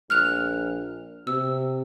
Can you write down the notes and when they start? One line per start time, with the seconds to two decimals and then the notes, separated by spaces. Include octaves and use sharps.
0.10 A#1 F6 F#6 F7
1.27 C3 E6